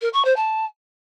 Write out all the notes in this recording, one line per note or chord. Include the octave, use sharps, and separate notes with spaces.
A#4
C#6
C5
A5